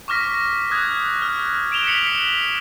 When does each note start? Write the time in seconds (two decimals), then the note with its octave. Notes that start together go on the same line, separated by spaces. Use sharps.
0.08 C#6 D6 F6 A#6 B6
0.71 D#6 F#6 G#6
1.22 F6
1.72 D7 E7 F7 G7
1.86 B6 C#7 F#7